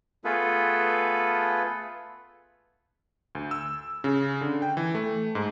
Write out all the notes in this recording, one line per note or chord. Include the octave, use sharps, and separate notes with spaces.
A3 B3 F4 G#4 A4 B4
D2
E6
C#3
D3
G5
E3
A3
G#2